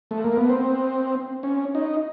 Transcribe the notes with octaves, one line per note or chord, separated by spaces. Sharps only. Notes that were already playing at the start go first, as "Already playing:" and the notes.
A3
A#3
B3
C4
C#4
D#4